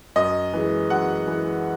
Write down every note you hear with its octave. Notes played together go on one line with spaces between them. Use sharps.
F#2 D#5
E3 G#3
F#2 F#5
E3 G#3